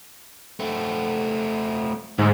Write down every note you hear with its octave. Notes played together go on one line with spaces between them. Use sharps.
A3 C4
D2 G#2